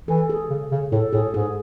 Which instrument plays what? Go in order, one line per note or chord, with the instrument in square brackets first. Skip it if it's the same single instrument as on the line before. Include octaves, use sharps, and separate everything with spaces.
[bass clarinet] E3 [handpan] A4
[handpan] G#4
[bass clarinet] C#3
C#3
[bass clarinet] A2 [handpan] A4
[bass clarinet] A2 [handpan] G#4
[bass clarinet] G#2 [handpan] G#4